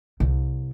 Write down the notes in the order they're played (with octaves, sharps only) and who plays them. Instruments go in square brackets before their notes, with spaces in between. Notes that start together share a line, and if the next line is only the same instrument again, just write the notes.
[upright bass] C2